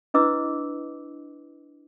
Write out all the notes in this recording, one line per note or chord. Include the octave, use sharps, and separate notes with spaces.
D4 E4 B4 D#5 D6 E6